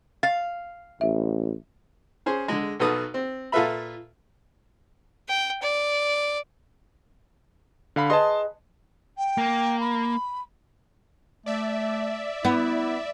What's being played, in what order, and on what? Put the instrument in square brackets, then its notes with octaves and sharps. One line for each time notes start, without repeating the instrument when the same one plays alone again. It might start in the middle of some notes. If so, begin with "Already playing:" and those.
[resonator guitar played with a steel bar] F5 [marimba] A6
[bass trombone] A1 [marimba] E5
[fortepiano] C#4 G#4 C5
D3 G#3
B1 B2 A4 B4 D#6
C4
A#2 F4 A4 B4 E5 B5
[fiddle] G5
D5
[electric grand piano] D3 F5 B5
[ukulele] G#4 B4 D#5 [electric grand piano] A5 C6
[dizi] G5
[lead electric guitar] A#3
[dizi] B5
[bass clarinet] A3 [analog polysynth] D5 E5
[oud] B3 [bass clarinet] E4